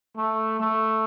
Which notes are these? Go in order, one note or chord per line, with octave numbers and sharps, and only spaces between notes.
A3
A3